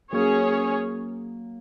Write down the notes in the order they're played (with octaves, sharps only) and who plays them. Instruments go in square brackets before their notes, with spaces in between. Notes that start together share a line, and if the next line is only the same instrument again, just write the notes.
[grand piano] F#3 A#3 [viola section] C#4 G#4 C#5